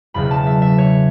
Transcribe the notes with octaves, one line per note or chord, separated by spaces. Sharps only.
E1 E2 C#3 F#3 B5
A5
E5
E5
C#5